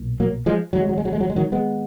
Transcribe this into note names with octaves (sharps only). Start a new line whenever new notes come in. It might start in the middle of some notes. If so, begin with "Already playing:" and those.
Already playing: B1 A#2
F#3 A#3
F3 G#3
G#1 G#2 F#3
G#3
F#3
G#3
F#3
G#3
F#3
G#3
D#3 F#3
G#3 B3